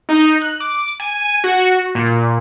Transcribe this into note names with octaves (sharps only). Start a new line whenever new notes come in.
D#4
F#6
D6
G#5
F#4
A#2